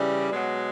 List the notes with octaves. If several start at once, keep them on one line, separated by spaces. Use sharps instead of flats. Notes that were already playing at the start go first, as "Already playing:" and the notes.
Already playing: C#3 E3 G3
B2 F#3 G#3